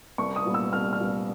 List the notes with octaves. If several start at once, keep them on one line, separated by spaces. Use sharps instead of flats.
C2 C#6
D#6
A#2 G3 B3
E6
C2 F6
F6
A#2 G3 B3